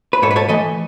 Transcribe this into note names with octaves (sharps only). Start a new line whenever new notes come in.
B4
G#2 A4 C#5
B4
A4 C#5
E3 A3 B4 D#5